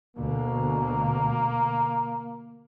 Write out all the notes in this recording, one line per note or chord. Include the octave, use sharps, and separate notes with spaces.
D2 B2 D3 A#3